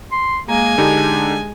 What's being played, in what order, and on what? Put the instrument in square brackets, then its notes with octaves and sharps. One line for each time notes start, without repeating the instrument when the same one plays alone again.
[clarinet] C6
[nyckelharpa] G#3 G#5 [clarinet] A#3 [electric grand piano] A#5
[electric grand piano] D3 D#4 G4 [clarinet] D4